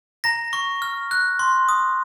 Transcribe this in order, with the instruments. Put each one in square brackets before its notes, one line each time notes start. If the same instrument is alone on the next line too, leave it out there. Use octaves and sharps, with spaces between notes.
[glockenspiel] A#5 A#6
C#6
F6
F#6
C6
D#6